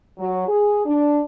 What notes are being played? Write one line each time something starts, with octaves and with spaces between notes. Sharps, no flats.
F#3
G#4
D4